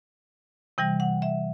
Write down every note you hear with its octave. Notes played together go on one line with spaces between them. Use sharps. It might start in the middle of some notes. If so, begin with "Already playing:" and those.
C3 E3 G3 G5
F#5
E5